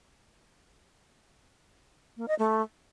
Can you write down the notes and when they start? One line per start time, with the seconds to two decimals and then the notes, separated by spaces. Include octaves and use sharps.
2.17 A#3
2.28 D#5
2.39 A3